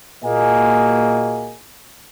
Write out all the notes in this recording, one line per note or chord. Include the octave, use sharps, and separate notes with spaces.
A#2 A#3 F#4 G#4 D#5 G#5